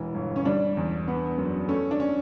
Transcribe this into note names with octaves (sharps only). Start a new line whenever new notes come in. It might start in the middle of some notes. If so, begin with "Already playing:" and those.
Already playing: E1 E3
G1
C#4
G3 D4
E2
B3
F#2
A3 C#4
D4
C#4